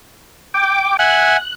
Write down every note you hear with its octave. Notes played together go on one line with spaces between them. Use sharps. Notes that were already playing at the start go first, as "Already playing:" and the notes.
G5 D6
E5 F#5 G#5 F#6